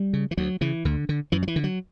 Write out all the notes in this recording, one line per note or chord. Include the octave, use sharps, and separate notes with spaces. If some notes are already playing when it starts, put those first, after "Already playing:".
Already playing: G3
C#3
E3
D2 F#3
C#3 E3
D2 D3
D3
F#2 E3
F#3
E3
D3
F#3